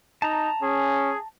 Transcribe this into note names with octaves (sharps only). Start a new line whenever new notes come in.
D#4 A5 A#5
C#4 G#4